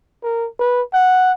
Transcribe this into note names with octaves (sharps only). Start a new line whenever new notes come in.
A#4
B4
F#5